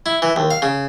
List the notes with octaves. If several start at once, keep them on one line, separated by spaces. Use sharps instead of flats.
E4
E3
D#2
F5
C#3